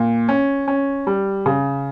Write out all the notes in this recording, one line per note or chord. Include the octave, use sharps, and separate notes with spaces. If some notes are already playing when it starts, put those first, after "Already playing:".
Already playing: A#2
C#4
C#4
G3
C#3